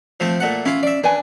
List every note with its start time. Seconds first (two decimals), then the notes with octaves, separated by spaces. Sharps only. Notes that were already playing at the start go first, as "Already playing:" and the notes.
0.20 F3 A3 C4
0.40 A#2 A3 F#5
0.65 C#4 E4 F4 F5
0.83 D5 E5
1.04 D4 B4 G#5